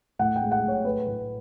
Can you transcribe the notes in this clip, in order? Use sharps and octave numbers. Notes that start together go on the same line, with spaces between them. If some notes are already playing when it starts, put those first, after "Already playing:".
A2 F#5
G5
G#3
F#5
A2
C#5
A3 B4
A2